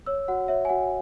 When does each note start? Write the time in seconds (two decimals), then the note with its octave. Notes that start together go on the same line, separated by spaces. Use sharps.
0.06 C#5 E6
0.28 F#4 F#5
0.48 C#5 E5
0.65 G#5
0.69 F#4 F#5